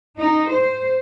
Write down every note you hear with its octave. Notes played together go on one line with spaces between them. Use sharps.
D#4
C5